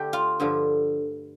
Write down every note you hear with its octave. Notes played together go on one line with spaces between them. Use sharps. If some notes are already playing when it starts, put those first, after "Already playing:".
Already playing: D3 A3 D4 G4
F4
G2 D3 F3